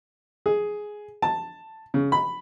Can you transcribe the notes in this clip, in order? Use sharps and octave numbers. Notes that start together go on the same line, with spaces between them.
G#4
A5
C#3
B5